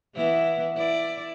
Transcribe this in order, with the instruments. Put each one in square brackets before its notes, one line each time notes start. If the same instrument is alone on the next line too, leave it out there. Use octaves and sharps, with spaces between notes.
[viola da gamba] E3 B3 E4
E4 D5